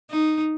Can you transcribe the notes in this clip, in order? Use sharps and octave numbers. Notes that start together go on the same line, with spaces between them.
D#4